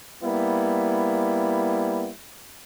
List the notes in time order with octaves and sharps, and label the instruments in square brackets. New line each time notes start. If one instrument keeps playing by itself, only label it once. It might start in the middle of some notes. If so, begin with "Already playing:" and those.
[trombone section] G3 A#3 B3 E4